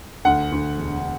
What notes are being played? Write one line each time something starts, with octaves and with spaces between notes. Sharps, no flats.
D2 F#5
D2
E1